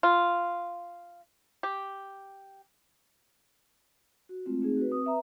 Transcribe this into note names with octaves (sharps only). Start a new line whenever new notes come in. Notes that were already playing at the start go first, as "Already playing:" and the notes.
F4
G4
F#4
G#3 A3 C4 F4
A3 C4 D#4 G#4
F#4 B4
C4 D#6
B4 E5 A#5